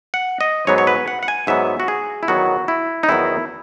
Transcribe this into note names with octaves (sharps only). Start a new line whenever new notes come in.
F#5
D#5
G#2 F#3 B3 C#5
C#5
B4
F#5
F#5
G#5
G#2 F#3 B3 E5
F#4
G#4
E4
E2 D#3 F#3 B3 F#4
E4
D#4
E2 D#3 F#3 B3 E4